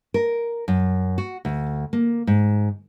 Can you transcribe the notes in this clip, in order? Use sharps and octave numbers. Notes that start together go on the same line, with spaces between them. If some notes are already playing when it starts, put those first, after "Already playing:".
A#4
F#2
F#4
D2
A#3
G#2